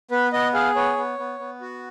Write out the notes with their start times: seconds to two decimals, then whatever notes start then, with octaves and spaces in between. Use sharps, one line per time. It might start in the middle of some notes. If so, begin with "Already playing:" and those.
0.11 B3 B4
0.33 B3 D#5
0.54 G#4 F5
0.75 B3 C#5
0.97 B3
1.18 B3
1.39 B3
1.61 F#4